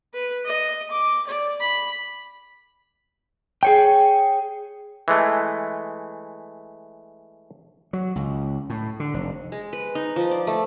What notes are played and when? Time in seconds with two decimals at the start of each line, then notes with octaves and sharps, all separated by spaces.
0.14 B4
0.46 D#5
0.91 D6
1.27 D5
1.60 B5
3.63 G#4 C#5 G5
5.08 E3 G#3 A3
7.93 F#3
8.16 C#2
8.70 A2
9.00 D3
9.14 F1
9.52 G#3
9.73 B4
9.95 D#4
10.16 F3
10.31 D5
10.47 A3